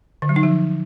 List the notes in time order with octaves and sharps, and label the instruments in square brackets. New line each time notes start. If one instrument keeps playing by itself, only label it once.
[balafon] D3
F#3
D#4
F3